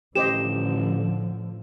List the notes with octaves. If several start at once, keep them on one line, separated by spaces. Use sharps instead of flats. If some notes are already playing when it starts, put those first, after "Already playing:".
A1 A2 D3 F3 G4 C5 D#5 E7